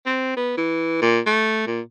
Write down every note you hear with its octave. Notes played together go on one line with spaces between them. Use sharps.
C4
B3
E3
A#2
A3
A#2